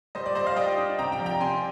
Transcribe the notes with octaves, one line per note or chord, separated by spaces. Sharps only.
G3 C5 D#5
D5
G3 C5 D#5
D5 F5
G3 D#5 G5
D4
C3 G5 A#5
G5 A#5
F3
G5 A#5
C3 G#5 C6